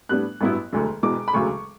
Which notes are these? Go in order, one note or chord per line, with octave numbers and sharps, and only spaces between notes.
A2 G3 B3 D4 F#6
A1 G2 F#3 B3 E4
E1 D2 D3 F#3
E1 E2 B2 D6
B5
E1 D2 C#3 F#3 C#6